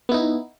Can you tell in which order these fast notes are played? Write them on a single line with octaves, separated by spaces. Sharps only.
B3 E4 D#4